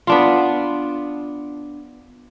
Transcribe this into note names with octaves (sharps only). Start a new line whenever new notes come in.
B3 D4 F4